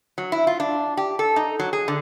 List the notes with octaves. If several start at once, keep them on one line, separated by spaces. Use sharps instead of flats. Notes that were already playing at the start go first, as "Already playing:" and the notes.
F#3
E4
F4
D4
G4
A4
D#4
F#3
G#4
D3